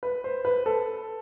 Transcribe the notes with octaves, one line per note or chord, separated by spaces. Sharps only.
B4
C5
B4
A4